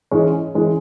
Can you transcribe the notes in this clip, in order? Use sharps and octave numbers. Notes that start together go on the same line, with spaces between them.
G#2 E3 G#3 C#4
E3 G#3 C#4